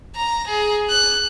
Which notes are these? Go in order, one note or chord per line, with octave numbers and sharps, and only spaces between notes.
A#5
G#4
F#6